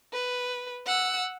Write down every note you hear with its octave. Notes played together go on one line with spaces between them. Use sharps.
B4
F#5 E6